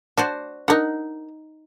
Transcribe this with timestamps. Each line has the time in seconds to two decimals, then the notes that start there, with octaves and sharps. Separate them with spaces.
0.17 D4 F#4 C5 D5
0.68 D4 D#4 A#4 D#5 F#5